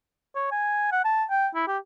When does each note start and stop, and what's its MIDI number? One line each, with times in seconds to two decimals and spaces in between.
0.35 0.47 73
0.51 0.89 80
0.92 1.01 78
1.05 1.24 81
1.30 1.47 79
1.55 1.66 64
1.67 1.78 67